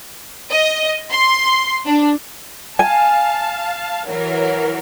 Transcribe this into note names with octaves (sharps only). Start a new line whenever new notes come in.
D#5
C6
D4
F5 G#5 A5
E3 F#3 A#4